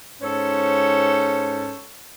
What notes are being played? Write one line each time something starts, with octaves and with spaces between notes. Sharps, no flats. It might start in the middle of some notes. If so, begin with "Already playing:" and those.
G#2 C#4 A4 C5 C#5